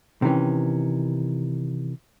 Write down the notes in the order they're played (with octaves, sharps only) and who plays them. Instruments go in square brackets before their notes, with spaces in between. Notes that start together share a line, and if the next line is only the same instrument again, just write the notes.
[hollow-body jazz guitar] C3 D#3 E3 C#4